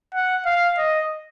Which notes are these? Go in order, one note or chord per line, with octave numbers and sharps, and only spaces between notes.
F#5
F5
D#5